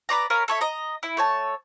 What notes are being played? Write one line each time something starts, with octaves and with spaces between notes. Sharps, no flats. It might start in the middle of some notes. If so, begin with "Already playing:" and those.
B4 C5 D5 A#5
C#4 A#4 F5 B5
A4 C#5 E5
D#5 A#5
E4
A3 C#5 A5